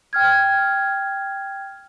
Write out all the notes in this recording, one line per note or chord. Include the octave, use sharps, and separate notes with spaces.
G5 F6 G#6